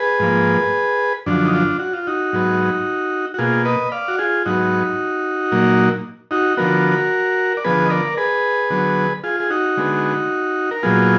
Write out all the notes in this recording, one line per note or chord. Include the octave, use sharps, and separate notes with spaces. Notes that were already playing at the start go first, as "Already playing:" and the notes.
Already playing: G#4 B4
G#2 F3 A#3
F#2 D3 F3 D4
D#4
D4 F4
F#4
F4
D#4 F#4
G#2 F#3 B3
F#4
B2 A#3 F4 G#4
B4 D#5
D5 F5
F#4
F4 G#4
G#2 F#3 B3 D#4 F#4
A#2 F#3 A#3
D#4 F#4
D3 F3 B3 F#4 A#4
D5
D3 F3 B3 G#4 B4
D#5
A#4 D5
G#4 B4
D3 F#3 B3
F4 G#4
G#4
D#4 F#4
D3 G#3 B3
A#4
A#2 F#3 B3 F4 G#4